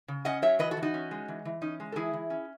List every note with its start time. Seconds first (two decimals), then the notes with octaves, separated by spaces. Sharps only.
0.08 C#3
0.25 C#4 D#5 F#5
0.42 F#3 C#5 E5
0.59 E3 B4 D#5
0.71 F#4 A4
0.77 E3
0.82 D#4 F#4
0.94 C#4
1.11 G#3
1.28 E3
1.45 E3
1.62 C#4 D#4
1.80 G#3
1.92 A4
1.96 E3 E4 G#4
2.13 E3
2.30 C#4